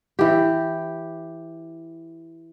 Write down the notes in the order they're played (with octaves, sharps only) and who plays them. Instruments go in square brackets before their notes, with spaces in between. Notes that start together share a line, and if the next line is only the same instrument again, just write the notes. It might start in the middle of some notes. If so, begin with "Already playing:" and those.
[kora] E3 G4